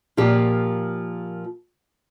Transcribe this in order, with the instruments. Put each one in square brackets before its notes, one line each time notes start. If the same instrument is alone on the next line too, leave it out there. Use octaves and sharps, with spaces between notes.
[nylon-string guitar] A#2 F3 A#3 G4